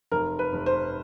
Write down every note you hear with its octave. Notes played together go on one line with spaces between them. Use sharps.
F1 A#4
B4
F1
C5